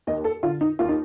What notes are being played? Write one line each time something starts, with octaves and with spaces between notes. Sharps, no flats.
D#2 D#5
A4
D3 F4
D#4
D#2 F4
D#4